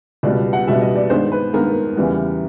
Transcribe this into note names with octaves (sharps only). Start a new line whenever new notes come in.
C#2 B2 G3 D5
F#5
C#2 B2 G3 E5
D#5
D5
G2 D#3 G#3 B3 C5
B4
G2 D#3 G#3 B3 A#4
E2 C#3 E3 G3 B3